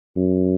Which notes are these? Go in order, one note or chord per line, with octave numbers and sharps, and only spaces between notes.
F#2